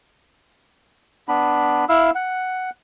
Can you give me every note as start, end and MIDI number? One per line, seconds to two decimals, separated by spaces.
1.28 1.85 59
1.28 1.85 62
1.28 1.85 83
1.89 2.10 64
1.89 2.10 77
1.89 2.10 88
2.15 2.70 78